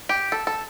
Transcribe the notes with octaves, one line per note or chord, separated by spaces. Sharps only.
G4
A4
A4